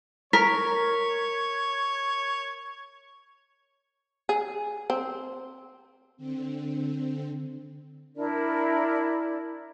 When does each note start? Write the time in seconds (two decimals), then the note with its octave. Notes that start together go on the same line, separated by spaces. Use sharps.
0.33 A#4 C#5 A#5 B6
4.29 G#4
4.90 C4
6.17 D3 C4
8.15 D4 E4 A#4 D5